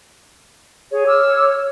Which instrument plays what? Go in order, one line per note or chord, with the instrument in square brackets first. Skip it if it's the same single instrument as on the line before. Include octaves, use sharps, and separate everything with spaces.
[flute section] G#4 [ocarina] C#5
[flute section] D6 E6 F6